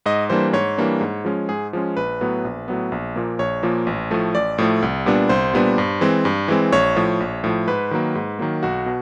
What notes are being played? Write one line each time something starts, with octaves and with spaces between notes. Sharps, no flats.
G#2 D#5
E3 G3 A#3 D4 C5
G#2 C#5
E3 G3 A#3 D4
G#2
F3 G#3 C#4
G#2 G#4
F3 G#3 C#4
A#1 B4
A2 F#3 B3
A#1
A2 F#3 B3
A#1
A#2 F3 A#3
A#1 C#5
A#2 F3 A#3
A1
A2 F3 A3
A1 D5
A2 F3 A3
C2
A#2 G3 B3 D4
C2 C5
A#2 G3 B3 D4
G2
E3 G#3 C4
G2
E3 G#3 C4
A#1 C#5
A2 F3
A#1
A2 F3
G#2 B4
D#3 F#3 A#3
G#2
D#3 F#3 A#3
B1 F#4
B2